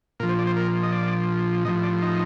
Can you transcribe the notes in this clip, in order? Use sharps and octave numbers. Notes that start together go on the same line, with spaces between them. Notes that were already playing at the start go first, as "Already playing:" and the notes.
A#2 F3 A#4
C5
D5
C5
A#4
D#5
D5
A2 F3 D#5
D5
D#4